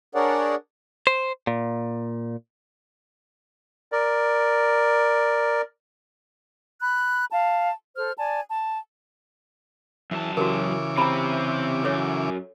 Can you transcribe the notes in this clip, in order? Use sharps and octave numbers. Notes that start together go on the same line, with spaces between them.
D4 G#4 A#4 C#5 D5 F#5
C5
A#2
A#4 D5
B5 F#6
F5 A5
A4 C5 F6
D5 G#5 A5
A5
F#2 E3 A5
C#3 E3 F#4 G4 A#4 D6
C3 C4 A#5 B5
F#2 A4 C#5